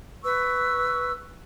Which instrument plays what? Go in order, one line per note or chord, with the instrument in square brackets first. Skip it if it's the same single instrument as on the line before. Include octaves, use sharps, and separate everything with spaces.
[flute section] B4 C#6 E6